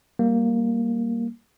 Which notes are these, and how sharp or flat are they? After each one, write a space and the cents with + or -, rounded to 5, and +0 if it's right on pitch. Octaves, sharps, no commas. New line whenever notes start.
G3 +0 A#3 +0